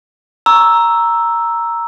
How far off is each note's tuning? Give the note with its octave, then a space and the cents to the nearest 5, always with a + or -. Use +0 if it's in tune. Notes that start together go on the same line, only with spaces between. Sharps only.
A#5 +0 C#6 +0 E6 +0